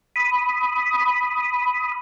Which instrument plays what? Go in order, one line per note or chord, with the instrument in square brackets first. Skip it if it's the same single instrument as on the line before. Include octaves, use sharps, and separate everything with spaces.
[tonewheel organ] B5 D#6